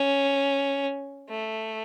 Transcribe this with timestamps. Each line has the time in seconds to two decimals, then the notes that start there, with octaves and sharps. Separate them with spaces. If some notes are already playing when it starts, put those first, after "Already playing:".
Already playing: C#4
1.30 A3